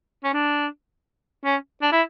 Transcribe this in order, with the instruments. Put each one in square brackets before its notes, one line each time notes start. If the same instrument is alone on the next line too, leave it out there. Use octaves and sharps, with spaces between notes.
[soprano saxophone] C#4
D4
C#4
D4
E4